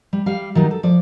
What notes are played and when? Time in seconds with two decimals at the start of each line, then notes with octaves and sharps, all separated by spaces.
0.13 G3
0.26 G3 F5
0.55 D#3 F#3 G3 D#4
0.71 A4
0.83 F3 D5